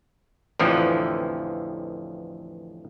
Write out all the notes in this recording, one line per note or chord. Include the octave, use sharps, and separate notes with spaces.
A1 F2 D3 E3 F3